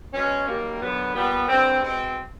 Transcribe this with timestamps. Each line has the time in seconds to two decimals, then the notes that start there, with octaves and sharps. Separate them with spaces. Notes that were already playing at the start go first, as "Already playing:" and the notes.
0.13 B2 G#3 C#4
0.47 F#2 D#3 G3 A#3
0.82 F#2 D3 F#3 B3
1.15 A#2 G3 B3
1.48 G2 D3 G3 C4
1.82 B2 G#3 C4